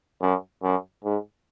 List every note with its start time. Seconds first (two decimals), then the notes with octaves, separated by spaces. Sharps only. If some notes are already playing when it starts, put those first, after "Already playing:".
0.22 F#2
0.63 F#2
1.04 G#2